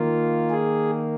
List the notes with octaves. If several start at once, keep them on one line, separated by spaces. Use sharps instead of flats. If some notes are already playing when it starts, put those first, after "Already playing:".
Already playing: D#3 A#3 F4
G#4